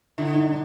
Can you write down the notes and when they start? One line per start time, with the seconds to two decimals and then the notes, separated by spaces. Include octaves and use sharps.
0.18 D3 E4
0.33 D#4
0.47 D4